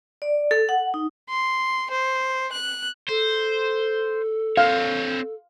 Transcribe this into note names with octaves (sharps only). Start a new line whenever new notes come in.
D5
A4
F#5
D#4
C6
C5
F#6
A4 C5
C4 C#5 F5